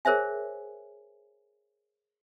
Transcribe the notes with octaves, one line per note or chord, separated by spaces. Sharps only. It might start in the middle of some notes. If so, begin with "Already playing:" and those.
G#4 A#4 C5 C#5 E5 G#5